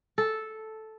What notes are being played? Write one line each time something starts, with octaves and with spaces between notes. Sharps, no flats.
A4